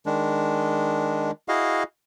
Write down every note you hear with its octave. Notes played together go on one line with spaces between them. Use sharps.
D#3 G#3 D4
E4 F#4 G#4 D#5 F5